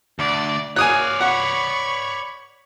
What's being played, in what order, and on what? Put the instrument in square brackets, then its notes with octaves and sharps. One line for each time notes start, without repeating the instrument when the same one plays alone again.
[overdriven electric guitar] D2 [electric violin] D5
[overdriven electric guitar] C#5 D5 [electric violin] F5 [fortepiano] G#5 D#6 F#6
[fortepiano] F#5 [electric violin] B5 C#6